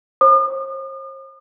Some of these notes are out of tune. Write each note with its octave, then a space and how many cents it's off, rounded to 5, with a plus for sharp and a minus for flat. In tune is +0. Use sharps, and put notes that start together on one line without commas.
C5 +45 D#6 -45